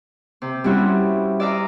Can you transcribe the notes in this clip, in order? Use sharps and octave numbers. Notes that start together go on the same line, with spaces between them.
C3
G3 C4 C#4 E4 F#4
D5 E5 F5 A#5 D#6